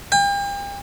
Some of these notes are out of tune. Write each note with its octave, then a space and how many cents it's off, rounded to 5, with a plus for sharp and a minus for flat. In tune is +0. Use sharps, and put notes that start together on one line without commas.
G5 +40